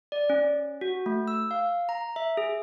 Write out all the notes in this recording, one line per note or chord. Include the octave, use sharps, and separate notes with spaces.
D5
C#4
F#4
A3
E6
F5
A#5
E5
G#4